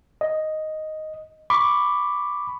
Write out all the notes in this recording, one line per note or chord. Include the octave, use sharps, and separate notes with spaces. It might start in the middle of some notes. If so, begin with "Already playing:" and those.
D#5
B5 C#6 D6